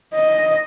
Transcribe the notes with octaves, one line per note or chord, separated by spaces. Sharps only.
D#5